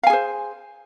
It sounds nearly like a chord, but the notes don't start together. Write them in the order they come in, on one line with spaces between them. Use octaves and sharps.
F5 G#5 G#4 C5